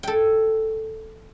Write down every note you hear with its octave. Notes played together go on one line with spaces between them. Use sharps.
A4 G5